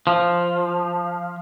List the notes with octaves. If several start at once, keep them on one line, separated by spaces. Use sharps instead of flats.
F3